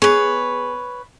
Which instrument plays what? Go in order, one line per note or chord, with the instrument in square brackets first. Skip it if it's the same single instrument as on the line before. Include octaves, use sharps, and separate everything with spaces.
[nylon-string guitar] B3 G#4 [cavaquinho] B4 C#5